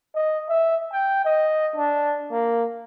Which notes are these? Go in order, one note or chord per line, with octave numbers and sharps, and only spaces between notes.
D#5
E5
G5
D#5
D4
A#3